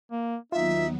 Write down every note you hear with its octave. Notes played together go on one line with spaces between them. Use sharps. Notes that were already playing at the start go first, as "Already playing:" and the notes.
A#3
D#2 F#3 B3 D#4 F4 E5